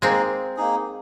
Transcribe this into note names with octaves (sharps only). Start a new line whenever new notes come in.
G#3 A#3 C4 D#4 G#4
A#3 D#4 G#4